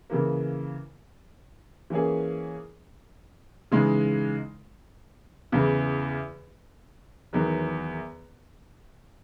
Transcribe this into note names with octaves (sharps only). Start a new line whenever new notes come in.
C#3 E3 A#3
E3 A#3 C#4 G#4
C#3 E3 G#3 D#4
E2 C#3 E3
E2 D#3 F#3 B3